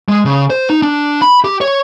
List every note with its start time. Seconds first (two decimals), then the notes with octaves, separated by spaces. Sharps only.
0.09 G#3
0.25 C#3
0.50 C5
0.70 D#4
0.82 D4
1.22 B5
1.44 G4
1.61 C#5